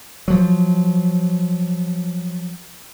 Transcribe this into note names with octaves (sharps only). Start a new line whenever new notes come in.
F3 F#3